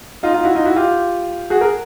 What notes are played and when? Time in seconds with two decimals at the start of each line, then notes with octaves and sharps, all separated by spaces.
0.23 D#4 F4
0.34 D#4 F4
0.44 E4 F#4
0.55 D#4 F4
0.65 E4 F#4
0.76 F4 G4
1.50 F#4 G#4
1.61 G#4 A#4